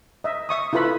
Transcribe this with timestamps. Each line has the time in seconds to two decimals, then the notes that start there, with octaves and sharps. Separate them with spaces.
0.24 D#5 E5
0.49 E5 C#6 D#6
0.73 E4 F4 A4 B4 B5